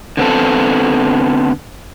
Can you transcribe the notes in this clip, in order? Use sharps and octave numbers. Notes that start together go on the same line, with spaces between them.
D3 B3 C4 A4